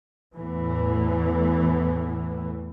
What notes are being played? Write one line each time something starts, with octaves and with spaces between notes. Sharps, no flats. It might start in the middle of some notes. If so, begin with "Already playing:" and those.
E2 A2 E3